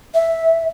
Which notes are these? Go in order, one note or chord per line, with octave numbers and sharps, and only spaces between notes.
E5